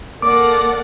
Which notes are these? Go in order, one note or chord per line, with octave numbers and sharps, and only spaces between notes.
A#3 A4 D5 F#5 D6